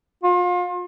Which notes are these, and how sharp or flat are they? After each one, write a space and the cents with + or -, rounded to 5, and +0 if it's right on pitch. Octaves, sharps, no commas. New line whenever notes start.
F4 +35